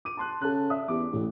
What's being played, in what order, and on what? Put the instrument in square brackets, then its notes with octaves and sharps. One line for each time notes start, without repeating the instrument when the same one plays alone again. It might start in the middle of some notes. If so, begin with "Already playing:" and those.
[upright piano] D6 D#7
A5 C6 F#6
[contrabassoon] C#3 [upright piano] A4 A5 F#6
[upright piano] D5 E5 D#6
[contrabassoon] E2 [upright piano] G4 D6
[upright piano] A1 [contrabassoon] A2